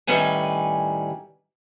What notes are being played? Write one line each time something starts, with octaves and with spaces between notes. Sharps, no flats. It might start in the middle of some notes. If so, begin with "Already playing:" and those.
A2 D#3 G3 C#4 B4 G#5